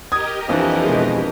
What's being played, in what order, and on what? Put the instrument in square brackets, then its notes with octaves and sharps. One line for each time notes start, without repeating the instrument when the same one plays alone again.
[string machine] G4 A#4 D#5 [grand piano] D#6 G#6
[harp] F2 D4 [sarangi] E3
[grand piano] B2 G#3